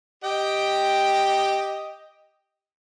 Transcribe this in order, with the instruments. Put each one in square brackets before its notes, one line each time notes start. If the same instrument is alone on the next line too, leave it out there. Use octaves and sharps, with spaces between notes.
[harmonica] G4 D#5 G5